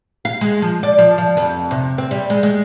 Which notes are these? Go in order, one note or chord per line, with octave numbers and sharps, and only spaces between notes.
F5
G#3
F3
D5
F3
F3
F2
C3
C4
G3
G#3
G#3